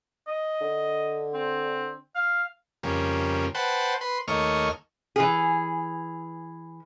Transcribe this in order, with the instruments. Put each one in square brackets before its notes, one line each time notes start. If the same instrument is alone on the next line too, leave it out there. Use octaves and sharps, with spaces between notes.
[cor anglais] D#5
[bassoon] D3
[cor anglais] C4
F5
[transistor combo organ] F2 C#3 G3 A#3
B4 C5 F#5 G5 A5
B4 C6
D#2 A3 A#3 C#5 D#5 F6
[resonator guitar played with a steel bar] E3 G#4